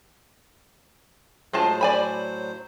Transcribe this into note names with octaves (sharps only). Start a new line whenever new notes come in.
A2 F#3 G#3 F4 C5 A5
D5 G#5 B5